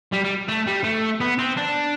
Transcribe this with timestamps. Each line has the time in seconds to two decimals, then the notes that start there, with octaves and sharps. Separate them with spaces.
0.12 G3
0.24 G3
0.48 A3
0.67 G3
0.84 A3
1.21 B3
1.39 C4
1.57 D4